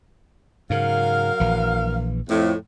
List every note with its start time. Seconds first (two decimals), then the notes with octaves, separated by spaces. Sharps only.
0.70 G#2 C#3 F#3 A#4 F5
1.40 A#1 E3
2.29 F2 A2